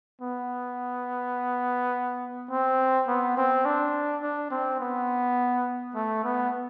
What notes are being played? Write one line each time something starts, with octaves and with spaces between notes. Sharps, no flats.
B3
C4
B3
C4
D4
D4
C4
B3
A3
B3